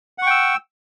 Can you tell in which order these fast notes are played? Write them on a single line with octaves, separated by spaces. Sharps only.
F#5 C#6 G5 E6